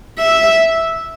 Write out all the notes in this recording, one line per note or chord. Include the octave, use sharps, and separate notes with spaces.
E5